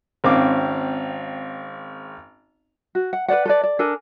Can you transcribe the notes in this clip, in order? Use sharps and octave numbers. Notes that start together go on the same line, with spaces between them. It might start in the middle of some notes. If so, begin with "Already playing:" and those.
G#1 C4 C#4 F5 D6
F#4
F#5
B4 C5 D5 F#5
A4 B4 D5
D5
D4 A4 A#4 G#5